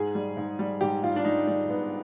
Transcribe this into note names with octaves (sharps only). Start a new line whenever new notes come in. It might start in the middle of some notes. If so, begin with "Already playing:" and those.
Already playing: G#2 G#4
G3
G#2
G3
G#2 G4
G#2 F4
D4
G3 D#4
G3 D4
G#2 B3